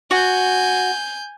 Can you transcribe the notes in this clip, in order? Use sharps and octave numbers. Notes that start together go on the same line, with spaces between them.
F#4 G#5 G6